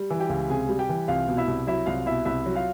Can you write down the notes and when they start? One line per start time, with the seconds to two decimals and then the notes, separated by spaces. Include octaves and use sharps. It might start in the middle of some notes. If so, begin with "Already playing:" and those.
Already playing: G3
0.10 E3
0.20 G4 G5
0.29 C#2
0.49 C3 G#4 G#5
0.69 G3
0.79 G4 G5
0.89 E3
1.08 C2 F4 F5
1.28 B2
1.37 E4 E5
1.48 C2
1.67 F#3 E4 E5
1.86 C2 F4 F5
2.06 B2 E4 E5
2.25 C2 E4 E5
2.46 F#3
2.55 F4 F5